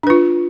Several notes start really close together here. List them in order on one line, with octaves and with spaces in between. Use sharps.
D4 B4 F4